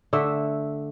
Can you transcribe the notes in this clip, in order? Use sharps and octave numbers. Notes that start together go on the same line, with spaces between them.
D3 A3 E5